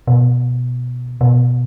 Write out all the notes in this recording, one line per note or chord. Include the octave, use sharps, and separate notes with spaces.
B2
B2